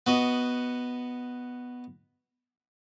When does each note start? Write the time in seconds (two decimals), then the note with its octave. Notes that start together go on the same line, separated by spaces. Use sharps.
0.07 B3 F#4 D#5